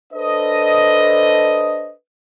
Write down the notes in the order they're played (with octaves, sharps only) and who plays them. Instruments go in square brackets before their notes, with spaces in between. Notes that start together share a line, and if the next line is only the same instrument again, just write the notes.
[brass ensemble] D4 A4 B4 C5 D#5